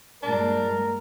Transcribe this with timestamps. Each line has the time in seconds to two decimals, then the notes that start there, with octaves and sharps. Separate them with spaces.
0.22 G2 A#2 G#3 D4 A#4